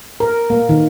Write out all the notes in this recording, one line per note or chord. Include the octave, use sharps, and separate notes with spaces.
A#4
A#3
D#3